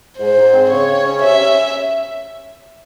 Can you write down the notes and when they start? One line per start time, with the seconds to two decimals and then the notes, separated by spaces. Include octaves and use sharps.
0.18 G#2 C5
0.36 G#2
0.53 C4
0.70 C#3 C#5
0.88 C#3
1.05 C#4
1.22 C3 E5
1.40 C#4